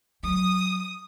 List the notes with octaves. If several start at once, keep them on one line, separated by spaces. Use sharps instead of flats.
F#3 D#6